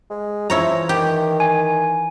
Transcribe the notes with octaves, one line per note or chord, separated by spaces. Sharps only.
G#3
E3 F3 E4 C#5 A#5
D#3 G4
G#5